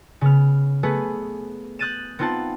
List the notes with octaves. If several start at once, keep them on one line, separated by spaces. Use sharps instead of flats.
C#3 B3 F6
A3 B3 G#4 B4
D#6 F#6 G6 A6 D#7 E7
B3 C4 D#4 F4 F#5 A5